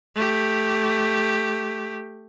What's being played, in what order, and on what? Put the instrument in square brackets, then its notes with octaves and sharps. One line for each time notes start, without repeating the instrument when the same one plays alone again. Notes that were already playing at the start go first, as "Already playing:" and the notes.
[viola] A3 G4